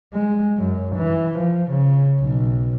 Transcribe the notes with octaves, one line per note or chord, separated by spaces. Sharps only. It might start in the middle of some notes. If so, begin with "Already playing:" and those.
G#3
F#2
E3
F3
C#3
B1